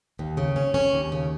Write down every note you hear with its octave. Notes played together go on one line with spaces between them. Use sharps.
D#2
C#3
C#4
C#4
D#2
C#3